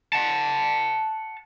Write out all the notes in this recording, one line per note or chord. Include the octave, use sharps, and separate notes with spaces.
F#5 A5